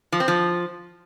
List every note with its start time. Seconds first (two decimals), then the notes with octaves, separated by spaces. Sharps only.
0.12 F3
0.20 C4
0.28 F3